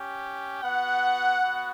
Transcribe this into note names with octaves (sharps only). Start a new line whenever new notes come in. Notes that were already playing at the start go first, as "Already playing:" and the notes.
Already playing: C#4 G4
B3 F#4 F#5
B3 F#4